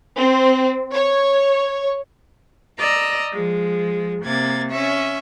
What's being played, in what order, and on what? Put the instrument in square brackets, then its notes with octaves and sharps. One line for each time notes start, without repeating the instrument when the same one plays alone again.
[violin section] C4
C#5
[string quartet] D5 D#5 A#5 E6
F3 G#3
C3 A#3 G#6 A6
C#4 E5 C#6